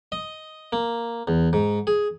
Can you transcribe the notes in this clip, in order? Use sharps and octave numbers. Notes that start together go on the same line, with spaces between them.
D#5
A#3
E2
G#2
G#4